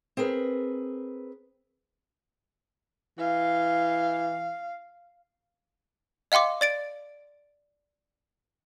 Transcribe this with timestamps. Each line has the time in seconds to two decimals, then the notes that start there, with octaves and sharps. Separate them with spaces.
0.17 C4 G#4 A#4 B4
3.19 E3 F5
6.32 D#5 F5 G5 C6 D6
6.61 D5 A6 D7